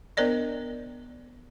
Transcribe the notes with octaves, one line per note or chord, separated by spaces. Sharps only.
B3 D4 A#4 C5 D5 D#5